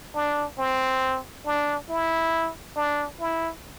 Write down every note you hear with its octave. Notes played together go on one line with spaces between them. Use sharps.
D4
C4
D4
E4
D4
E4